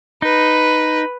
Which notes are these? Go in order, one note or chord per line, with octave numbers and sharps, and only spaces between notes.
D#4 B4